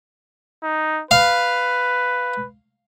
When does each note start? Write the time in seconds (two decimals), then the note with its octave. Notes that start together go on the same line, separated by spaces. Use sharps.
0.63 D#4
1.11 B4 F5